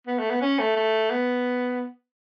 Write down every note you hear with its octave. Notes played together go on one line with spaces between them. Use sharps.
B3
A3
B3
C#4
A3
A3
B3